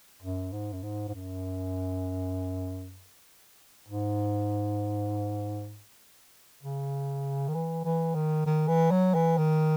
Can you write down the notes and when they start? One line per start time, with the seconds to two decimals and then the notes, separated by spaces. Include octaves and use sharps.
0.22 F#2
0.53 G#2
0.73 F#2
0.83 G#2
1.08 G#2
1.14 F#2
3.88 G#2
6.63 C#3
7.48 D#3
7.55 E3
7.85 E3
8.15 D#3
8.46 D#3
8.68 E3
8.91 F#3
9.15 E3
9.38 D#3